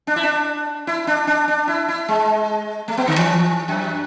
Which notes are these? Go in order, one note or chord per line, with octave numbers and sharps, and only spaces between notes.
D4
E4
D4
E4
D4
D4
D4
E4
E4
G#3
A3
B3
D3
E3
F#2